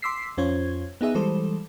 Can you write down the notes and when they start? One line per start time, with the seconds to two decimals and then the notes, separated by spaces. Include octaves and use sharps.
0.02 C6 D6 E6 B6 C7
0.38 F2 C#4 F4 C5 C#5 G#6
1.01 B3 D#4 G#4 E5
1.15 E3 G3 G#3 A4 C5